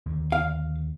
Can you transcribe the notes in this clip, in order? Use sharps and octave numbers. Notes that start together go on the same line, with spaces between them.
D#2 D3
F5